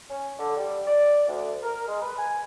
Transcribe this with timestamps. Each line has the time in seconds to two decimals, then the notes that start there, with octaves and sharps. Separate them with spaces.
0.10 C#4
0.39 D3
0.57 G3
0.88 D5
1.27 D2
1.63 A#4
1.88 G#3
2.02 B4
2.18 G#5